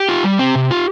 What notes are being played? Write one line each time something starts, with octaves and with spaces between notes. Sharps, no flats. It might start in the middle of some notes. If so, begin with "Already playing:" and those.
Already playing: G4
F4
G3
C4
C3
F4